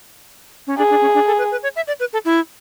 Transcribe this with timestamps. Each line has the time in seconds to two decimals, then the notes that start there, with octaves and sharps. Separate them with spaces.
0.67 C#4
0.77 D4 G#4
0.90 D4
1.01 C#4
1.14 D4
1.27 A4
1.38 B4
1.51 B4
1.63 C#5
1.76 E5
1.87 D5
2.00 B4
2.13 A4
2.25 E4